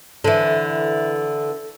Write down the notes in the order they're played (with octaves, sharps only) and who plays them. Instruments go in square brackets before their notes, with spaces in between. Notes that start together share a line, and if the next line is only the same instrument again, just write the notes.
[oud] D3 E3